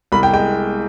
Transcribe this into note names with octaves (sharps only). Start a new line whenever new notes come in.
C2 B5
G5
G#3 G5